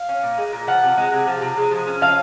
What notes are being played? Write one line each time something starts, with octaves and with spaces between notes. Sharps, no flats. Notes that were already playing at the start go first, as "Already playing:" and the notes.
Already playing: F5
C#4
A#2
G#3
A#2
F3 F#5
C3
G#3
C3
F3
C3
G#3
F3
C#4
F3 F5